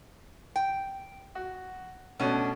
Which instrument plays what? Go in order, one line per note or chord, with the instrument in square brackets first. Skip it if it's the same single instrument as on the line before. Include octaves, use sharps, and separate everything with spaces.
[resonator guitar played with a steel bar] G5
[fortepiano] F#4
[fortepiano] B2 A3 C#4 [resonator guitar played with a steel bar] D4